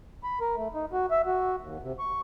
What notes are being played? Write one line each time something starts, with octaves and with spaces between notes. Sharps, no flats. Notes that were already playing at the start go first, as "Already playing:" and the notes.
B5
A#4
A3
D#4
F#4
E5
F#4
D#2
C3
C#6